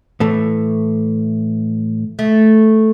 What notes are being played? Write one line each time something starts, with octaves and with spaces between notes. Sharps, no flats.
A2 E3 A3
A3